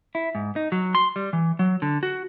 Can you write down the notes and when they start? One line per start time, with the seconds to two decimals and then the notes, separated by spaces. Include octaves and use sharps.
0.15 E4
0.35 G#2
0.56 D#4
0.72 F#3
0.95 C6
1.16 G3
1.33 E3
1.59 F#3
1.82 D3
2.03 F#4